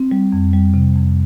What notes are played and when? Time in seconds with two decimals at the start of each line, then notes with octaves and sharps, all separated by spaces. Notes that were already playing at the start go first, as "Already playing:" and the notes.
Already playing: C4
0.11 G3
0.33 F2
0.53 G3
0.74 C3
0.96 F2